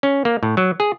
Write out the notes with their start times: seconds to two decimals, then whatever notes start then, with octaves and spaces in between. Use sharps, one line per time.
0.03 C#4
0.25 A#3
0.43 A2
0.57 F#3
0.80 G#4